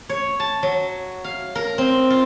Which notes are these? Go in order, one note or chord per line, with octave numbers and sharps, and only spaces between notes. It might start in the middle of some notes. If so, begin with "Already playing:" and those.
C#5
A5
F#3
F5
A#4
C4
F4